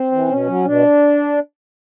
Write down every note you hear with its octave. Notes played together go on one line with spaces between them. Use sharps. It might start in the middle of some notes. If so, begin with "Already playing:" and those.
Already playing: C4
E3
B2 C#4
F#3
B2 D4